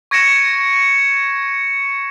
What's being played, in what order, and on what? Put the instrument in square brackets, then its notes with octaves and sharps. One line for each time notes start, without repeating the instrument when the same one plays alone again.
[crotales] C#6 G#6 A#6 C#7 D7 E7